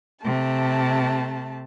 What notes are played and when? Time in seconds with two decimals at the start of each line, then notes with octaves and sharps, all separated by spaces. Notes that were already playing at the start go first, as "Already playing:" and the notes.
0.22 C3 A3 A5